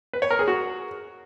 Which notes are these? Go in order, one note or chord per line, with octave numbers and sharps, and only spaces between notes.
B4
C#5
A#4
G#4
F#4